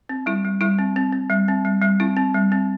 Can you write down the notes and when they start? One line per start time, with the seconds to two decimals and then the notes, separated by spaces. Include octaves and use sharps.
0.09 C4
0.26 G3 E4
0.45 G3
0.61 G3 E4
0.79 C4
0.96 C4
1.12 C4
1.30 G3
1.48 C4
1.65 G3
1.82 G3
2.00 C4 E4
2.16 C4
2.34 G3
2.52 C4